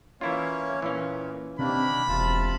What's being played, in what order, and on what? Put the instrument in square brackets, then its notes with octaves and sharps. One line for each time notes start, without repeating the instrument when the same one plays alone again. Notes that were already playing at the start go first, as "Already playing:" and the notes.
[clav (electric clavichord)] E3 E4 F4 [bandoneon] A#3 C#4 C#5
[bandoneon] A#2 [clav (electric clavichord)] E3 C#4
[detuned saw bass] C3 [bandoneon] D#3 A#3 D4 [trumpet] B5
[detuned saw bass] E1 [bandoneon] C3 F4 A5